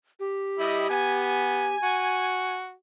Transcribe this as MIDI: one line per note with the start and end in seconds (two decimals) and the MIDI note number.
0.20 1.77 67
0.59 0.88 55
0.59 0.87 64
0.59 0.88 75
0.90 1.75 59
0.90 2.57 80
1.83 2.74 66